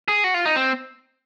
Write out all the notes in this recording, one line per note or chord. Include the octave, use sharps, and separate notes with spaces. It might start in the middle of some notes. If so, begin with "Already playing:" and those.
G#4
F#4
F4
D#4
C4